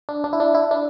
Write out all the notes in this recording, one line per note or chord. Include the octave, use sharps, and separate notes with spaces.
D4
D4
E4
D4
E4
D4